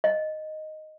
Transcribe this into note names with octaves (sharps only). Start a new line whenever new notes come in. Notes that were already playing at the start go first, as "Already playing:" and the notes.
D#5